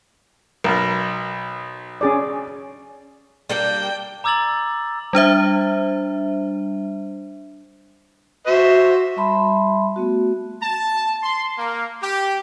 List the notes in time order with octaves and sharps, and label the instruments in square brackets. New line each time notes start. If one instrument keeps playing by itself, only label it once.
[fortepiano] B1 B2 [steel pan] A#4
[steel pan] C#4 G#4 D5
[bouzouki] G3 A#3 D4 [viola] G5
[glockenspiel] A#5 D6 E6 G#6 A6 F#7
[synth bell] G3 D4 C5 E5
[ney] F#4 [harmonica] C5 E5
[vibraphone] G3 E5 A5 B5 C6
A3 B3 F#4
[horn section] A5
C6
A#3
G4